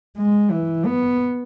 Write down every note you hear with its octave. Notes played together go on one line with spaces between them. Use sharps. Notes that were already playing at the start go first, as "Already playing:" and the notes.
G#3
E3
B3